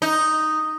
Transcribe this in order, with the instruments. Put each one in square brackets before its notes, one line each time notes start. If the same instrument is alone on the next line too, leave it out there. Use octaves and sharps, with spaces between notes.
[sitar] D#4